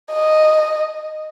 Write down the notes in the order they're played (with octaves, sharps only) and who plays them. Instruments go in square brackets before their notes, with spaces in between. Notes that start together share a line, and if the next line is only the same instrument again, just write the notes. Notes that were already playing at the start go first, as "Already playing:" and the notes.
[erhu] D#5